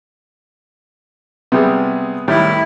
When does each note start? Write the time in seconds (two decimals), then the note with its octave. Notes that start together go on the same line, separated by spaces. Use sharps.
1.52 C3 G3 B3 G#4
2.28 A2 D#3 G3 E4